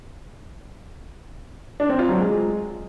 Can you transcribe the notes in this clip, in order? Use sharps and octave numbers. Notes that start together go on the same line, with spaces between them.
D4
C4
F4
F#3
G#3